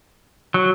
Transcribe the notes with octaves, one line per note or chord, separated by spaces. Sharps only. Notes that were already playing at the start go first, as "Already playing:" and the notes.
F#3